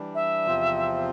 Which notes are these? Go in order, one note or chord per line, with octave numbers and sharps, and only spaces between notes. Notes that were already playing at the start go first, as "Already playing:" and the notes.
Already playing: E3 G3 D4
E5
E2 C3 F3 C4 F4